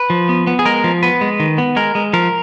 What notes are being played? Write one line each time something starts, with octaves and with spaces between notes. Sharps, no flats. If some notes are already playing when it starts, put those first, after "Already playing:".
Already playing: B4
F3
B3
B3
G#4
G#3 A#4
F3
B3 B4
G#3
D#3
B3
G#3 A#4
G#3
F3 A#4